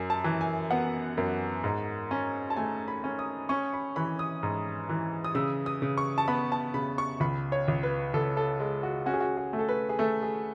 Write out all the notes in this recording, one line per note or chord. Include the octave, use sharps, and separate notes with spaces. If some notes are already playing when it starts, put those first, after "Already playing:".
Already playing: F#2 G#5
A5
E3
G#5
B3 F#5
F#2
G#2
C#4
A5
A3 G#5
B5
C#4
D#6
C#4 C#6
B5
E3 B5
D#6
G#2
E3
D#6
C#3 E6
D#6
C#3
C#6
A5
B3 B5
A5
C#3 B5
C#6
C#2 B5
C#5
C#2
B4
C#2 A4
A4
G#3
F#4
C#4 F#4
G#4
F#4
G#4
A3
A4
B4
G#4
A3 A4
G#4